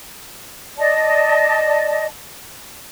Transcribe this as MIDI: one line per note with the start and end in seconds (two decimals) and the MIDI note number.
0.77 2.05 74
0.77 2.05 75
0.77 2.05 81